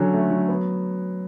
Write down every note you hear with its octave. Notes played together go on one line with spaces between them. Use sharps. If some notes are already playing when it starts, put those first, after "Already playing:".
Already playing: D3 F#3 C#4
A3
F#3
B3